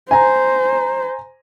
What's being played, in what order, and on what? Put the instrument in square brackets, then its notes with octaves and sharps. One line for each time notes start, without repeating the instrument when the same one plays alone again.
[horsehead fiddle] C5 [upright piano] G#5 A#5